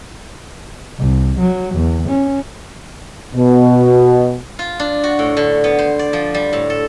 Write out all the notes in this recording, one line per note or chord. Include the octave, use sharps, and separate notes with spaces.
C2
F#3
E2
C#4
B2
F4
D4
F#4
A2
D3
B3
C5
D5
F3
G3
A2
A4